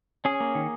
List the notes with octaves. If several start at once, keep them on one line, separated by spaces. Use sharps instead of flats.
C#4 G#4
A#3
D#3